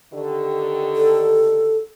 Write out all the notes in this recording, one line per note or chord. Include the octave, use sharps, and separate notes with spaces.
D3 D#3 G4
A4